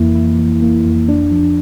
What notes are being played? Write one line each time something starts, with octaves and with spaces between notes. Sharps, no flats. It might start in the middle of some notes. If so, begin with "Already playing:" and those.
Already playing: F2 E3 A#3 E4
E4
E3
A#3
F2
D4
F3